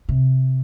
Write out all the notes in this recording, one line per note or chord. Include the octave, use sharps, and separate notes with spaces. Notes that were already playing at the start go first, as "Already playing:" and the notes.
C3